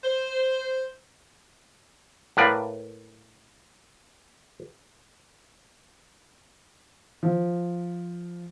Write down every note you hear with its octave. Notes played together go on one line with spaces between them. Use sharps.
C5
A2 A#3 B4 D5
F3